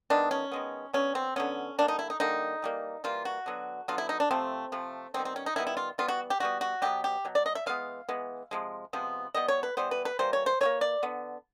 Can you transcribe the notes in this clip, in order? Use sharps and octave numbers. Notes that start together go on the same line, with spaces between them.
D#3 G#3 B3 D4
C#4
D#3 G#3 B3
D3 F#3 B3 C#4
C4
D3 F#3 B3 C#4
D3 G3 A#3 D4
D#4
E4
D#4
D3 G3 A#3 D#4
E3 G3 A#3
E3 G3 A#3 F4
F#4
D3 F#3 B3
D3 F#3 B3 F4
E4
D#4
D4
C3 F3 A3 C4
C3 F3 A3
D#3 G3 B3 C4
C4
C#4
D#4
D#3 G3 B3 E4
E4
F4
E3 G3 B3 F4
F#4
G4
E3 G3 B3 F#4
F#4
B2 F#3 B3 G4
G4
B2 F#3
D5
D#5
E5
E3 G#3 B3 F5
E3 G#3 B3
C3 F3 G#3
C3 F3 G#3 B3
E3 G3 B3 D#5
C#5
B4
E3 G3 B3 C5
B4
B4
E3 G3 A#3 C5
C#5
C5
E3 G3 A#3 C#5
D5
D3 B3